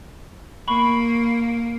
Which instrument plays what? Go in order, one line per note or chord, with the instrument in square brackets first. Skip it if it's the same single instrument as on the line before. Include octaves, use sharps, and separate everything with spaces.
[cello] A#3 [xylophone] B5 C#6